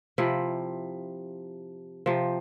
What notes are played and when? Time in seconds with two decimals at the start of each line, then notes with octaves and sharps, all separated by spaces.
0.18 C3 F3 E4
2.06 C3 F3